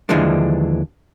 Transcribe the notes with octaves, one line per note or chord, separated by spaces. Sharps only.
D#2 D3 E3 F3 G#3 D4